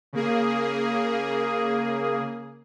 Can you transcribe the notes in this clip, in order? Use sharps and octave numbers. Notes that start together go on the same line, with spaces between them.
C#3 A#3 G#4